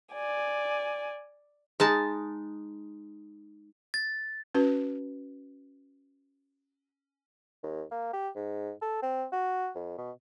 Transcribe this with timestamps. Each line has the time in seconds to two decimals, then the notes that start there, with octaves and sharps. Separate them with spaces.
0.14 D5 G#5
1.80 G#3 D#4 A5
3.94 A6
4.55 C#4 F#4 B4
7.63 D#2
7.91 A#3
8.13 G4
8.36 G#2
8.82 A4
9.02 C4
9.32 F#4
9.75 F2
9.98 B2